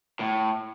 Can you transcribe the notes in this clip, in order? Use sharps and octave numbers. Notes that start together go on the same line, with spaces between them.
A2